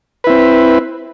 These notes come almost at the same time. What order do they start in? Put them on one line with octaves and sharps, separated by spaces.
B4 E4 C4